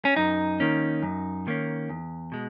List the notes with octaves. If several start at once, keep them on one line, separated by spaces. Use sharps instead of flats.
C#4
F#2 D#4
D#3 A#3 C#4
F#2
D#3 A#3 C#4
E2
B2 G#3